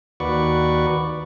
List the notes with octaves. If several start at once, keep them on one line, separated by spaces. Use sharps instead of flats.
D#2 F#4 B4 D5 C#6